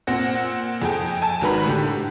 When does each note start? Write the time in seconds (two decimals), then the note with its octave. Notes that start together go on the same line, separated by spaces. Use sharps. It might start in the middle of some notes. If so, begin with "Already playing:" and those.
0.07 A#2 C4 F#5 A#6
0.82 F2 G#4 A4 G5
1.22 G#5 A5
1.41 G#1 D#3 F#4 B4 A#5 B5
1.65 A2 D3 G4